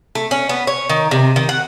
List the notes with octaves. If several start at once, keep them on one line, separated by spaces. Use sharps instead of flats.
A3
C#4
B3
C#5
D#3
C3
D#3
F#5